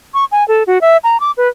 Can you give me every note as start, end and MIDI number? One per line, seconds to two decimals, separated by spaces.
0.14 0.25 85
0.32 0.46 80
0.48 0.63 69
0.67 0.81 66
0.81 0.97 76
1.04 1.20 82
1.20 1.31 86
1.37 1.48 71